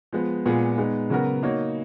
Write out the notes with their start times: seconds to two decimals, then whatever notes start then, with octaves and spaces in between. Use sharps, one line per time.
0.13 F3 G#3 B3
0.45 A#2 G#3 B3 F4 G#4
0.78 G#3 B3 D#4
1.10 C#3 F#3 B3 F#4 A#4
1.43 A#3 D#4 F#4 C#5